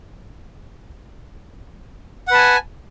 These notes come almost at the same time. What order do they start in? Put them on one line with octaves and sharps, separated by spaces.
F#5 B4 A5 G#5